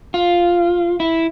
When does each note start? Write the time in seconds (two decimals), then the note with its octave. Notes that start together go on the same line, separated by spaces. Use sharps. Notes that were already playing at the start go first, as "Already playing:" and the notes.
0.14 F4
1.00 E4